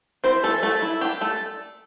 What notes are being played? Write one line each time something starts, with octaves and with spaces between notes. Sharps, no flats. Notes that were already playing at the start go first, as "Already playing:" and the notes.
C4 E4 C5
A3 A4
E3
A3 A4
A3
E4
D4 G4
A3 A4